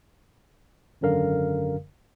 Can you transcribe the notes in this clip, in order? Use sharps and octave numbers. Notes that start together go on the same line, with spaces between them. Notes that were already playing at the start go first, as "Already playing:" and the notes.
G#1 F#2 D3 A#4 F5